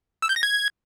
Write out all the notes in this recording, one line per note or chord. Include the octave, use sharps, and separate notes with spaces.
E6
G6
A#6
G#6